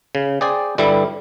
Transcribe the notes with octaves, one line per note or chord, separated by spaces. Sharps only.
C#3
G#4 C5 D5 G5 G#5
G2 D3 G3 E4